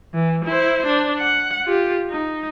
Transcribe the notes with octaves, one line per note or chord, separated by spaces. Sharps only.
E3
E4 C5
D4
F#5
F4 G4
D#4